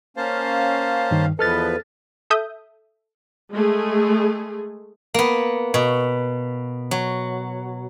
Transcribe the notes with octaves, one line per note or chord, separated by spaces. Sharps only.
A#3 C#4 C5 F5 A5
G2 D#3
E2 F3 A4 B4 D#5 F6 A6
A4 E5 D#6 G6
G#3 A3 G#4
A#3 B3
B2
F#3